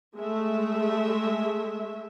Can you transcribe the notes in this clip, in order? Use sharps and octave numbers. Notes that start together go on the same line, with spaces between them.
G#3 A3 E5